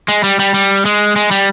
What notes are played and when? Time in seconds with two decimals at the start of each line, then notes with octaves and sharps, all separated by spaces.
0.08 G#3
0.24 G3
0.39 G3
0.54 G3
0.85 G#3
1.16 G#3
1.31 G3